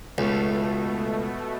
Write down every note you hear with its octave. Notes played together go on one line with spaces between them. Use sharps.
C#2 B2 A3